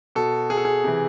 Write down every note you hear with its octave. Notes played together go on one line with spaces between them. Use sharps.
B2 A4
G#4
A4
G#4
C3 E3